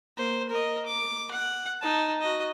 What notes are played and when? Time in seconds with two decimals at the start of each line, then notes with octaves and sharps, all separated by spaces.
0.17 A#3 C5
0.50 A#4 D#5
0.86 D6
1.31 F#5
1.81 D#4 A5
2.21 F#4 D#5